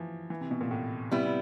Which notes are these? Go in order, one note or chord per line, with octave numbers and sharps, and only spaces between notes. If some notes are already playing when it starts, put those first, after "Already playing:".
Already playing: E3 F3
E3
C3
B2
A#2
A2
C3 G3 B3 E4
C3